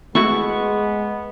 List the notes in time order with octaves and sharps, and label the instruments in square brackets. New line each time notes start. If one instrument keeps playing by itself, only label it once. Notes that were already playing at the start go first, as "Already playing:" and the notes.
[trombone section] G#3 [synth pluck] A3 E4 F#4 [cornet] B3 [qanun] C#6